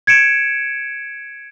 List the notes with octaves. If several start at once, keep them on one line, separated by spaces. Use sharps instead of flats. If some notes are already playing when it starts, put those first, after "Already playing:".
G#6 C#7 D7 E7